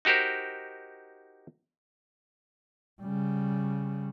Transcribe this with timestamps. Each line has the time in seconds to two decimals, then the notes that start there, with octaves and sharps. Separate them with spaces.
0.05 D#4 F#4 G4 A#4 C5
3.02 C#3 G3